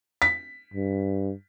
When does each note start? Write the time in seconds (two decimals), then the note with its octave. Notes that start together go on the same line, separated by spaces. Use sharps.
0.22 B6
0.74 G2